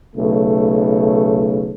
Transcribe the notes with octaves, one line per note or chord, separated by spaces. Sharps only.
B1 C#3 A3